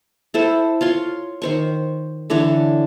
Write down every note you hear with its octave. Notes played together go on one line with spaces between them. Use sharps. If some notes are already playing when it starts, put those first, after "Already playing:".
E4 A4 C5
F4 C#5 C6
D#3 C5 C#6
D3 E3 D4 C#5